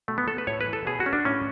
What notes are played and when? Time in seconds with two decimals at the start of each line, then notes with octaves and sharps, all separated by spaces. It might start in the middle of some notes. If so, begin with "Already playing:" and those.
0.08 B2 A3
0.18 B3
0.28 A4
0.38 B4
0.47 A2 C#5
0.61 B4
0.66 E3
0.73 A4
0.87 B2 G#4
1.00 F#4
1.06 C#4
1.13 D4
1.25 A2 C#4